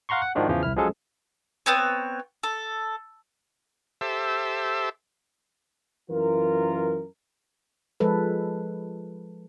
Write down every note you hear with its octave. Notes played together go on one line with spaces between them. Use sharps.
F5 F#5 A#5 C6 C#6
F#5
G#2 D#3 F3 G#3 D4 F#4
E2 C#3 E3 F3
C2 E4 F6
F3 F#3 G#3 C#4 G#4 A4
B3 C4 C#5
A4
G4 A4 C5 E5
F#2 E3 F4 A#4
F3 G#3 A4 B4